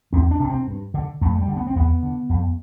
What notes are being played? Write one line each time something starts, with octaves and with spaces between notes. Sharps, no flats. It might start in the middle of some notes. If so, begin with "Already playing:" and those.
E2 C4
D4
C3
C4
G2
D3
F2 A3
G3
D3
B3
C4
E2 B3
D3
F2